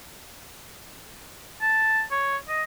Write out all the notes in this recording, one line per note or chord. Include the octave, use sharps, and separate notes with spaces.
A5
C#5
D#5